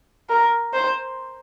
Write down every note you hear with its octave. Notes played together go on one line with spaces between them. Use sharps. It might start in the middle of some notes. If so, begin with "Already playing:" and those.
A#4
C5